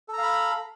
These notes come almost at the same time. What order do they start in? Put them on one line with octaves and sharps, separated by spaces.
A4 A#5 F5 B5